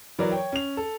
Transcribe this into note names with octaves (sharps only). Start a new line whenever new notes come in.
E3 F#3 A#4 B4 D5
C#5 G5
C#4 F7
A4